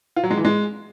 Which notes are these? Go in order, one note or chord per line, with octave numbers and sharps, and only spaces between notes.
F4
F#3
G#3
E3
G#3